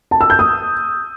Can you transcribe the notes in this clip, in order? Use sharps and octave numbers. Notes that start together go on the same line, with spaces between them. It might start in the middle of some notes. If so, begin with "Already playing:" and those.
A5
E6
G6
D#6